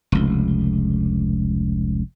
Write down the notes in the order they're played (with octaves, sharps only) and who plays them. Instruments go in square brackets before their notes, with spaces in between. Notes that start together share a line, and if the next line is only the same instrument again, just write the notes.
[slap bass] F1 C#2